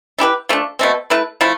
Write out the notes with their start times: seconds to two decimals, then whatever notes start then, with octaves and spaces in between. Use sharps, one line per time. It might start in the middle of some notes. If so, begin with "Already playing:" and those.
0.18 A3 E4 G4 B4
0.49 F3 A3 D4
0.79 B2 A3 C4
1.10 A3 E4 B4
1.41 F3 A3 E4